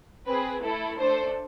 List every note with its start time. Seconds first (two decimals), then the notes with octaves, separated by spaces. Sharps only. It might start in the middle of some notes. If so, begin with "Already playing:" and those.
0.26 C4 G#4 B4
0.61 A3 E4 A4
0.97 A3 D4 A4 C5